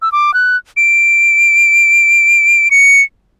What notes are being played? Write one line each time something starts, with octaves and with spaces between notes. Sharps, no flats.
E6
D6
F#6
D7
C#7